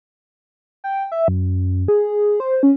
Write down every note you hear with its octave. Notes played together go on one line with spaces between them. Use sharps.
G5
E5
F#2
G#4
C5
C#4